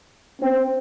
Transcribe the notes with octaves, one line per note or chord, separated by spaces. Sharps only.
C4